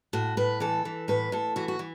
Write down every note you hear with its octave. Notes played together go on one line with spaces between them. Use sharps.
A2 F#4
A2 B4
E3 A4
E3
A2 B4
A2 A4
E3 F#4
F#4
E3